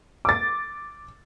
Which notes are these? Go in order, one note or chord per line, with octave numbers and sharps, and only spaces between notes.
D6 A6